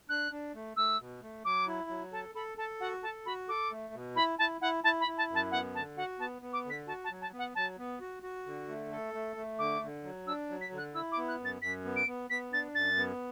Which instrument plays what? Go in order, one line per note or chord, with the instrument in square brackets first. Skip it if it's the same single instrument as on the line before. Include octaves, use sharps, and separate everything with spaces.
[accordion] D4 [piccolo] F#6
[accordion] D4
A3
[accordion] A3 [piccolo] E6
[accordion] B2
A3
[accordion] F#3 [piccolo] D6
[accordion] E4
F#3
[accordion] A4 [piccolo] A5
[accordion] A4 [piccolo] B5
[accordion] A4 [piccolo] A5
[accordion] F#4 [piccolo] F#5
[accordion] A4 [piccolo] A5
[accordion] F#4 [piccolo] B5
[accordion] A4 [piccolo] D6
[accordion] A3
B2
[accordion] E4 [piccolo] B5
[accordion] E4 [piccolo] A5
[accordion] E4 [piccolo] F#5
[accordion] E4 [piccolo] A5
[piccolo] B5
[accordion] E4
[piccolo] A5
[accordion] F#2
[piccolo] A5
[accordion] B3 [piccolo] F#5
[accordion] D3 [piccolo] A5
[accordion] F#4 [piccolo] F#5
[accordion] B3 [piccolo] A5
[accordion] B3
[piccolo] D6
[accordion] D3
[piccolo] B6
[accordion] F#4 [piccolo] A5
[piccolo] A5
[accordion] F#3
[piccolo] A5
[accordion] B3
[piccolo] F#5
[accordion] F#3 [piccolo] A5
[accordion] B3
F#4
F#4
D3
A3
A4
A3
A3
[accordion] D3 [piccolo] D6
[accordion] D3
F#3
[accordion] D4 [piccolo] E6
[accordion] F#3
[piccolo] B6
[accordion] D3
[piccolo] F#6
[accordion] E4 [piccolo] E6
[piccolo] D6
[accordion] B3
[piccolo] F#6
[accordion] F#2
[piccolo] A6
[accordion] F#2 [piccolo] B6
[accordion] B3
[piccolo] D7
[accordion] B3
[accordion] B3 [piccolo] B6
[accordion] D4 [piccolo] A6
[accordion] F#2 [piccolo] A6
[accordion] B3